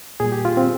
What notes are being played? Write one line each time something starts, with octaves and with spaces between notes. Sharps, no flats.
A#2 G3 G#4
G4
F4
C4